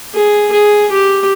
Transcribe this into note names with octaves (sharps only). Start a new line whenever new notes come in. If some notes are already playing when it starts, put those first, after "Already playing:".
G#4
G#4
G4